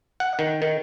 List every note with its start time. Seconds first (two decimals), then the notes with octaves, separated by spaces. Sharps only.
0.20 F#5
0.39 D#3
0.62 D#3